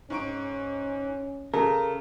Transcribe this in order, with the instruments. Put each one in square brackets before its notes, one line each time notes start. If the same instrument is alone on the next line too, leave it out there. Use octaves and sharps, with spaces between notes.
[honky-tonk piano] G#2 C#6 D7 [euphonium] C#4
[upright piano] C#3 [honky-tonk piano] A4 [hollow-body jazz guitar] A#4